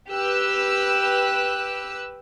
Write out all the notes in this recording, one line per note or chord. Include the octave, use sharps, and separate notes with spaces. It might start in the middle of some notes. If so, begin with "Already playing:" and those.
G4 B4 E6 F#6